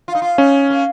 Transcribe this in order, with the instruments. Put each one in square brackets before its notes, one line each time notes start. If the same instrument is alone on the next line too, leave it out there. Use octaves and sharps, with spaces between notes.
[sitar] F4
D#4
F4
[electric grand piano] C#4 [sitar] D#4
[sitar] A#3